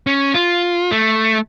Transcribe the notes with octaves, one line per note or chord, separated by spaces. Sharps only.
C#4
F4
A3